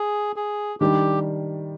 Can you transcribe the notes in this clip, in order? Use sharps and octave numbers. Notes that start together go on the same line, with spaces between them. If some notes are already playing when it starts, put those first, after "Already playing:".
Already playing: G#4
G#4
D#3 G3 D4 G4